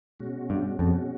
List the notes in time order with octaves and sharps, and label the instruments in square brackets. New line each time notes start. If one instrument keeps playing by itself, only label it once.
[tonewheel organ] B2 G#3 C#4 F#4
[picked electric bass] G2
[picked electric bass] F2 [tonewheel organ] B2 G#3 C#4 F#4